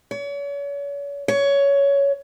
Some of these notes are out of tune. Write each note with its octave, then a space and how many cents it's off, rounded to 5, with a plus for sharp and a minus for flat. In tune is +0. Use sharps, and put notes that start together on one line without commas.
C#5 +40
C#5 +15